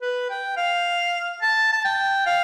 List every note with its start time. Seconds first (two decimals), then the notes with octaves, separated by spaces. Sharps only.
0.02 B4
0.30 G5
0.57 F5
1.42 A5
1.73 A5
1.85 G5
2.26 F5